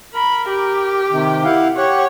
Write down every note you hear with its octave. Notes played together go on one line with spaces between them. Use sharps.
A#4 B5
G4
C3 D#3
E4 F5 F#5
G4 C#5 F#5